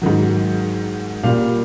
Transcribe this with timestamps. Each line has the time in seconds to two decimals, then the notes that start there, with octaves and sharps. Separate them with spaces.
0.02 G#2 D#3 F#3
1.23 A#2 G3 A#3 F5